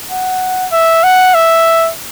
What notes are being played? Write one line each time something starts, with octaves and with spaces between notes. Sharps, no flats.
F#5
E5
F#5
E5